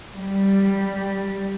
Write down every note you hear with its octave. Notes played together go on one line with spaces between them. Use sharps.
G3